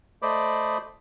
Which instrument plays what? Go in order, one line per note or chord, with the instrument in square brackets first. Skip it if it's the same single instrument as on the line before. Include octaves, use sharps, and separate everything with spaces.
[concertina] A3 C5 D5 D#5 B5 D6